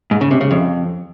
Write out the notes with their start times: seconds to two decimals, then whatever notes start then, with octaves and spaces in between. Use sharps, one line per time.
0.11 G#2
0.21 C#3
0.31 C3
0.41 C#3
0.51 F2